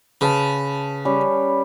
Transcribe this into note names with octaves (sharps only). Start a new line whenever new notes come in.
C#3 B4 A5
G3 C#4